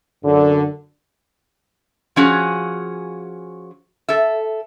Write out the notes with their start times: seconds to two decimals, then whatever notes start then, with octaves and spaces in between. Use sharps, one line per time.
0.25 F#2 D3
2.16 F3 C#4 F#4 G#4
4.08 A4 E5